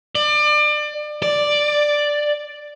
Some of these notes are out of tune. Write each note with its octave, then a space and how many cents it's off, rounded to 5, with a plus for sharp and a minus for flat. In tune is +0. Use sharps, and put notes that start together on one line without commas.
D5 +30
D5 +5